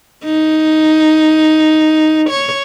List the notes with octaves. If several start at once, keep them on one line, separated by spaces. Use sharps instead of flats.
D#4
C#5